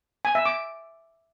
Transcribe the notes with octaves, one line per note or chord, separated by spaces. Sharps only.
G#5
E5
D6